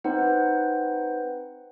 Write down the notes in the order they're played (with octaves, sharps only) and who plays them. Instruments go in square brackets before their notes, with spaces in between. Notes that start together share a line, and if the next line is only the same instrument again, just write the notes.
[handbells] C4 D#4 B4 C5 F#5